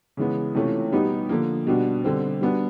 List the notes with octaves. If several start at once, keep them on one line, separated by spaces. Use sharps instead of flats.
C#3 E3 G#3 B3
C3 E3 A3 C#4 F4
B2 G3 B3 D#4 G4
D3 F3 A#3
B2 G3 B3 D4 F#4
D3 G3 C4
G3 B3 D4 F#4